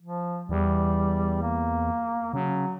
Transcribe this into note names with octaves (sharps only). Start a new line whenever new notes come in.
F3
E2 G3
A#3
C#3 F#3